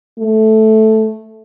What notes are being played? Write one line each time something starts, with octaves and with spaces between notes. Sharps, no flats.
A3